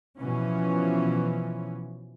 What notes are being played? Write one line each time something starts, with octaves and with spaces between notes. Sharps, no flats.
B2 E3 F3 C#4